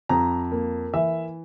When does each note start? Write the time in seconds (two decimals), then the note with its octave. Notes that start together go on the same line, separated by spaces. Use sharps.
0.09 F2 A#5
0.52 A#3
0.94 E3 E5